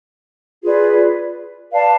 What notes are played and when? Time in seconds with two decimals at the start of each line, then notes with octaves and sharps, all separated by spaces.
0.62 F4 G#4 B4 D5
1.70 B4 D5 F5 A5